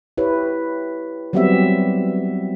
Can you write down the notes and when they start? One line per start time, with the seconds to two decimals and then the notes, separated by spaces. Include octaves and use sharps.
0.18 E4 G4 B4 C#5
1.33 F#3 G3 B3 C4 G4 E5